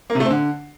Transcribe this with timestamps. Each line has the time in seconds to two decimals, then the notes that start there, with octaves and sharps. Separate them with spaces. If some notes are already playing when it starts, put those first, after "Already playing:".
0.10 A#3
0.15 C3
0.20 A3
0.25 C4
0.30 D3